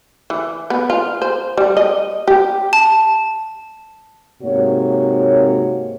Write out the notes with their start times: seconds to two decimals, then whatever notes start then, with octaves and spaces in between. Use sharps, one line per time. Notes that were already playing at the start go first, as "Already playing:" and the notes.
0.30 E3
0.70 B3
0.90 F4
1.22 C5
1.57 G3
1.77 D#5
2.28 G4
2.73 A5
4.43 G#2 C3 A#3 F#4 C#5